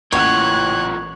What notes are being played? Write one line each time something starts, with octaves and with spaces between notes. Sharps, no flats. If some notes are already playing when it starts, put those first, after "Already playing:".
A1 A#2 E3 C#5 F#5 F#6 G#6